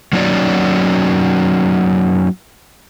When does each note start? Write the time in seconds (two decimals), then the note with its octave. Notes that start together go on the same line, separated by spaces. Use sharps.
0.13 F#3 A#3 C#4 D#4 F#4 D5